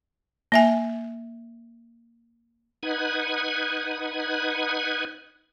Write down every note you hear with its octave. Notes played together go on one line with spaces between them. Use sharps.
A#3 E5 G#5
D#4 B4 F#5 G#6